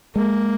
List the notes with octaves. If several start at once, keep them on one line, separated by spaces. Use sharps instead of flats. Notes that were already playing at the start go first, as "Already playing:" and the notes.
G#3 A#3